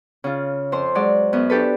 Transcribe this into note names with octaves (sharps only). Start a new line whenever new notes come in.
C#3 F4
F2 C5 C6
F#3 G#3 D5
F#2 B3
D4 G4 A4 B4